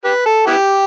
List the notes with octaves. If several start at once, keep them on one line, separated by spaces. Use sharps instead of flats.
G4 B4
A4
B3 E4 G4